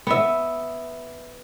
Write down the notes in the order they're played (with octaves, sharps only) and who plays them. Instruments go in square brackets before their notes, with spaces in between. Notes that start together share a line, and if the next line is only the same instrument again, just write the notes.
[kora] B3 E5